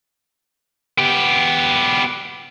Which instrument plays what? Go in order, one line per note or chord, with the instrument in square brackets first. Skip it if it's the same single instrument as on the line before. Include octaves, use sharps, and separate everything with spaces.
[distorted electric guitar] B3 G4